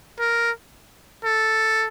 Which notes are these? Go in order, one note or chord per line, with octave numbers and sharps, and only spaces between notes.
A#4
A4